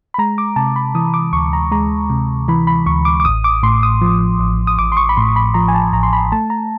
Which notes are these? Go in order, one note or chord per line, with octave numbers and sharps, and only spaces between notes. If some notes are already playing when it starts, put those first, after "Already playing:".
B5
G#3 A#5
D6
C3 A5
B5
E3 D#6
D6
D2 C#6
A#5
G#3 A#5
C3
E3 B5
B5
D2 C#6
D6
D6
A1 D#6
D6
A2 C6
D#6
F3
A1
D#6
A1 D6
C6
C#6
B5
A2 C6
B5
F3 A#5
G#5
A5
A1 A#5
C6
B5
A3 A5
A#5